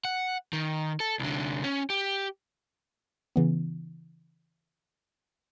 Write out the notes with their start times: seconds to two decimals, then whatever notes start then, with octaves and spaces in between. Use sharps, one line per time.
0.05 F#5
0.53 D#3
1.00 A4
1.19 C2 D3
1.64 C#4
1.90 G4
3.36 C#3 E3 B3